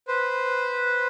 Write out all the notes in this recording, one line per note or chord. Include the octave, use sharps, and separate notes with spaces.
B4 C5